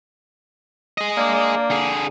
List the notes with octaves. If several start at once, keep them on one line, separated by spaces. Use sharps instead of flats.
G#4 D#5
A#3 D4 D5
D3 G#4